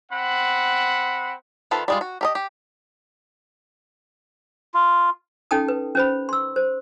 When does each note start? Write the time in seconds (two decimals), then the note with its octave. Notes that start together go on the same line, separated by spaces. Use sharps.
0.11 C4 F#5 B5
1.71 D#3 F4 A4 B4 C5
1.88 G3 G#3 F4
2.01 F#4
2.21 G4 A#4 D#5
2.35 G4
4.74 F4
5.51 C#4 D#4 A4 G5 A5 D#6
5.68 B4
5.95 C#4 C5 B5
6.29 C6 E6
6.56 C5